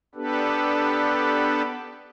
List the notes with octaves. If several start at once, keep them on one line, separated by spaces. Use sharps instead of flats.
B3 D4 G4 A4 B4